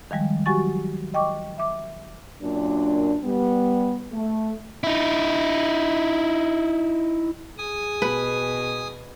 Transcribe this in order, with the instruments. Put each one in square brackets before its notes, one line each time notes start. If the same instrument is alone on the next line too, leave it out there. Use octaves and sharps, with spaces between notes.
[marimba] D#3 F3 G3 G#3
F#3 F#4 G4 G#5 C#6 A6
D#5 G5 C#6 D6
E5 D6
[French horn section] F#2 A#2 D4
G3 B3
A3
[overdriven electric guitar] D#4 E4
[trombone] G#4 [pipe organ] G#5 D#6
[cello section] B2 [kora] B4